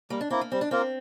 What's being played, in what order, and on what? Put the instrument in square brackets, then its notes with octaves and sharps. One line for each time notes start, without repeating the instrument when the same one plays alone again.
[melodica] G3 [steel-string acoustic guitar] A#3
[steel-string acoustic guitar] D4
[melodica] A#3 E4 [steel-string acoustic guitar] C4
[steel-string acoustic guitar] A#3
[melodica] G3 [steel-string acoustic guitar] C4
[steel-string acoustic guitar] D4
[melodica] A#3 F4 A#4 [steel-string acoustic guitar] C4